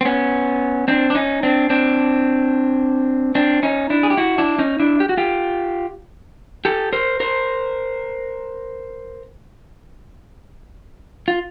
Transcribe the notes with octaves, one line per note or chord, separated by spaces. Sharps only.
C4
B3 C#4
C4 D4
D4
C#4 D#4
C4 D4
C4 D4
C4 D4
C#4 D#4
D4 E4
G#4
G4
E4 F#4
D4 E4
C#4 D#4
D4 E4
G4
F#4
F4 G4
G4 A4
A#4 C5
A#4 C5
F4